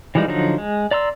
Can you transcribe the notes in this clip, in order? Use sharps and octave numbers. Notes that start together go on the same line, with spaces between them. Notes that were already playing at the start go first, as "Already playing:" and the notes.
E3 F3 G3 G#3 D#4
D3 F3 F#3 D#4
G#3
D5 A#5 C6 E6